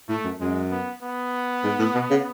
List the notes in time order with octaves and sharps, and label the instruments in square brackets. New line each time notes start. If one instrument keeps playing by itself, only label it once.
[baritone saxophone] A2 [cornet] A3
[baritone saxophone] F#2
[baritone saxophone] F#2 [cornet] G#3
[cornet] B3
B3
[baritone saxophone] G#2
A2
B2
C#3